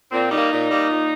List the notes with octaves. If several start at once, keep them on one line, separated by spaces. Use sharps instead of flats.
A#2 C4
G3 A#3 D#4
A#2
G3 A#3
A#2